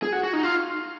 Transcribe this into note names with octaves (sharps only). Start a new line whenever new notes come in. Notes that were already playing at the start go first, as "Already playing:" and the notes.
G#4
F#4
F#4
D#4
F4